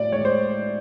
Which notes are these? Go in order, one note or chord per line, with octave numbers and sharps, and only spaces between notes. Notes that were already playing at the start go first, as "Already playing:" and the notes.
Already playing: A2 F#3 D5
G#3 C#5
C5